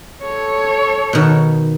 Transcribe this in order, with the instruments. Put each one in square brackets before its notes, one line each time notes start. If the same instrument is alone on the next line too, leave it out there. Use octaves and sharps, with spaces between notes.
[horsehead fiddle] A4 C#5
[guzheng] B2 D#3